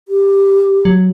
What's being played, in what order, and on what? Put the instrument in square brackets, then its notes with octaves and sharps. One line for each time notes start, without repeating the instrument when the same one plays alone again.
[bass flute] G4
[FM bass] F#3